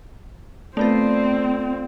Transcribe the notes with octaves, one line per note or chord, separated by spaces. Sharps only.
A3 B3 C4 F4 A4 C5 D5